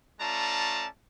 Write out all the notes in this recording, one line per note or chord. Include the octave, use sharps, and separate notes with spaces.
A3 C#4 F4 D5 A5 A#5